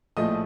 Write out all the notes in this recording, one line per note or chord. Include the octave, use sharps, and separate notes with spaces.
A#1 A2 F3 A3 D#5 D#6